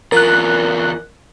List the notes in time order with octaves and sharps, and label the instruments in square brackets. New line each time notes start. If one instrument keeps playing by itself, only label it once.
[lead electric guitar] E2 F4 [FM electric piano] A#4 F#6